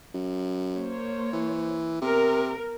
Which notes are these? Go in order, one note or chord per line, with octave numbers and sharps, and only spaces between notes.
F#2
A#3 C5 C#5
E3
C3 B3 A#4